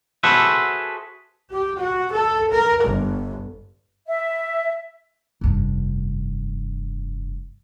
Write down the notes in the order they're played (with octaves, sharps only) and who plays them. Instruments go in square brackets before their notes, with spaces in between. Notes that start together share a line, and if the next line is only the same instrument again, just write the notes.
[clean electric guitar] F#4 G#4 A4 B4 C5 E5
[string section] G4
F#4
A4
A#4
G1
[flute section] E5
[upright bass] F1 G2